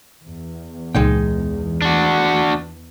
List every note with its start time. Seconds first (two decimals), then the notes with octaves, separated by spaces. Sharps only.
0.25 E2
0.95 C#2 A#2 G#3 D#4 G5
1.82 D4 F#4